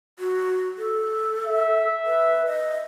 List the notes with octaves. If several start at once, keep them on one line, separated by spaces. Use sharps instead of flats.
F#4
A4
E5
B4
D#5